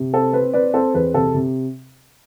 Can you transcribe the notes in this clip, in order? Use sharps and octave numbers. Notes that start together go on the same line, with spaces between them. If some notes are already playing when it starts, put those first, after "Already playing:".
Already playing: C3
C4 A4
C4 B4
C4 B4 D5
C4 A4 C5
E2 B4
C3 A4
C3